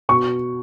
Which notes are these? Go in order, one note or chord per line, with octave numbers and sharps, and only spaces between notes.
B2 C#6